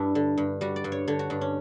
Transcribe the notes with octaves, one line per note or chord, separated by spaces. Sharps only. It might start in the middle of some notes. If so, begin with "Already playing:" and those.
Already playing: G2 G3 D4 E4
D3
G2
G3 F#4
D5
G2
C#5
D3 C#5
F#4
G2 D4
C#4